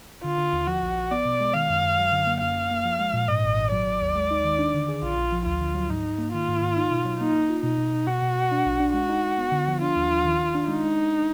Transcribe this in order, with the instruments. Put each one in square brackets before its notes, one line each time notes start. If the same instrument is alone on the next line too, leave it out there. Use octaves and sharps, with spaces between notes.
[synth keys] D3 [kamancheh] F4
[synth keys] D3
D#2
[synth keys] F3 [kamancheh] F#4
[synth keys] A#1
A#1
[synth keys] B3 [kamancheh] D5
[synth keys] B2
G#3
[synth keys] D#3 [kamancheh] F5
[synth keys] F#2
F#2
F#3
D3
A#3
[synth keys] F#2 [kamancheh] F5
[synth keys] F#2
A#3
F3
G#3
A#2
[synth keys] G#2 [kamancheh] D#5
[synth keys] G#1
G#1
[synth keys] F#3 [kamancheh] D5
[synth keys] F#3
D#2
G#3
D#4
D#3
D4
D3
G#4
[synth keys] A#1 [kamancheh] F4
[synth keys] A#1
F3
[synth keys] D2 [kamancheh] F4
[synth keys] D3
F#3
[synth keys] G#2 [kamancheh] D#4
[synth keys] G#2
A#3
[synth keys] D#3 [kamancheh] F4
[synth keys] G#2
G#2
D#4
B2
F#3
[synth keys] A#3 [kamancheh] D#4
[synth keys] A#3
F4
[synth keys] B2 [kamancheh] D#4
[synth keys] B2
B2
[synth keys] B2 [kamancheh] F#4
[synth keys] B2
B2
D4
A#1
D4
[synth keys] G#3 [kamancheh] F#4
[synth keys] D#4
D#4
B3
D3
F3
[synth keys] D4 [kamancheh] F4
[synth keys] D#2
D#2
D#3
D#3
D4
[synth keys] G#3 [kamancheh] D#4
[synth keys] G#3
G#3